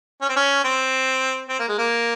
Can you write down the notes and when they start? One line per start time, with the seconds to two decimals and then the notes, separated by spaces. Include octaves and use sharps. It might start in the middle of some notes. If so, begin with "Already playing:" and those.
0.22 C#4
0.29 C4
0.36 C#4
0.64 C4
1.49 C4
1.59 A#3
1.68 G#3
1.78 A#3